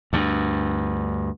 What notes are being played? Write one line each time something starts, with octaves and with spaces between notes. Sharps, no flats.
D2 G2